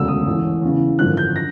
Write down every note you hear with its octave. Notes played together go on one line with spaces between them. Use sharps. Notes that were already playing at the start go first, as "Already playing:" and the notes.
Already playing: E1 D2 C#3 E6
D#6
A1 A2 E3
E2 C#3 E3
G#1 F#2 D3 F3 F#6
G6
A#6